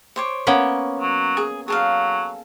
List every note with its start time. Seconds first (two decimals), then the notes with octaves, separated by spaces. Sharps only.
0.16 C5 C#5 D6
0.47 A#3 B3 C#4
1.00 F#3
1.37 G#4
1.68 F#3 G#4 A4 F5